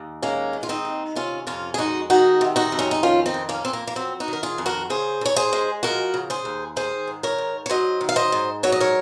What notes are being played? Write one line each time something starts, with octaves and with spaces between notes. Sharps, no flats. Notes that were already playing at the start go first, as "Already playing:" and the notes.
Already playing: D#2
G#3 A#3 C#4
D#3
F4
C4 D#4
D#2
C3 C#4 F4
F2 C#4 F4
G#4
G#3 D#4 F#4
D#3 D#4 F#4
C3
D#4 F#4
F2
C#4
D#4
D#3 C#4 F4
C4 D#4
F2
A#3 C#4
F2 C4
A#3
A#3
F#3 C4
D#4 F#4
D#3 A#4
F4 G#4
F2
F#4 A#4
C#3 G#4 C5
D#2 C#5
G#4 C5
G#3
F3 F#4 A#4
C#3
G#4 C5
D#2
D#3 G#4 C5
G#2
A#4 C#5
G#2
C#5
F#3 C5 D#5
D#3
F5
C5 D#5
G#2
F#3 C#5
D#5
A#4 C#5